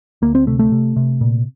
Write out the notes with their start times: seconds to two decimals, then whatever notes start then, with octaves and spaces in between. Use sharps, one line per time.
0.22 D2 A#3
0.35 C4
0.47 C3 A3
0.59 A3
0.72 C3
0.96 C3
1.21 A#2